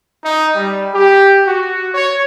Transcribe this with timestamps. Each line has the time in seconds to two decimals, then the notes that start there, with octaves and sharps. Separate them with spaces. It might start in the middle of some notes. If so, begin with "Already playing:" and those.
0.24 D#4
0.55 G3
0.93 G4
1.46 F#4
1.94 C#5